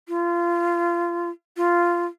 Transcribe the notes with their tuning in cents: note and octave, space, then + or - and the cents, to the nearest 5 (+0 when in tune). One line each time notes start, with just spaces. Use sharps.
F4 -25
F4 -10